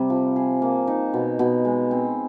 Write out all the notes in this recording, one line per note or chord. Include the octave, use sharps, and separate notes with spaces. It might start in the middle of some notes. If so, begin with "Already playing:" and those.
Already playing: C3 G3
F3
G#4
A#3
D#4
B2
B2
G#3
C4